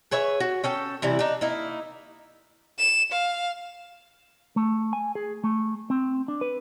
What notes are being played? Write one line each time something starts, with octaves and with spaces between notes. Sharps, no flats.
G#4 B4 C#5 E5
F#4
C#4 A4 G5
C3 E3 G3 E4
D4 D#4
A#3 D#4 E4
E7
F5
A3
G#5
G#4
A3
C4
D4
B4